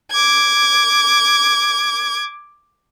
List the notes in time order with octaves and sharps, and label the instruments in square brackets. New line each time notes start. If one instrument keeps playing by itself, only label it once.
[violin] D6 G#6